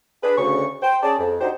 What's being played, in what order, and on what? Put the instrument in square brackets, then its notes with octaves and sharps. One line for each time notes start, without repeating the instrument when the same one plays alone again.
[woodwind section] D4 G#4 B4
D2 C#3 C#6
C5 G5
C#4 G#4 D5 A5
F2
D4 D#4 F#4 G4 C5